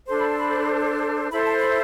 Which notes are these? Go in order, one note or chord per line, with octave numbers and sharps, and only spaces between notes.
D4 A4 C5 C6
B5
A5
B5
E4 A4 C5 B5
A5
B5